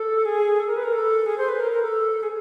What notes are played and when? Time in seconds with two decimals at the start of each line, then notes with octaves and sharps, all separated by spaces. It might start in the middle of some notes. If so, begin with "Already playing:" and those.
Already playing: A4
0.25 G#4
0.60 A4
0.67 A#4
0.77 B4
0.84 A#4
0.93 A4
1.26 G#4
1.38 C5
1.49 B4
1.60 A#4
1.71 A#4
1.82 A4
2.23 G#4